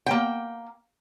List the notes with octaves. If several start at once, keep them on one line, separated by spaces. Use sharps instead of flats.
A#3 G5